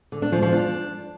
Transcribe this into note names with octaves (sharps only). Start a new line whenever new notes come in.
D3
D4
F3
F3
D4